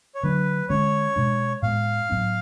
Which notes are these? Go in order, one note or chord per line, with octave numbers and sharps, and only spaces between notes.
C#5
D3 F#3 A3 D4 B4
D3 G#3 C#4 C#5
B2 G#3 D4
A2 G#3 B3 F5
A2 F#3 B3 D4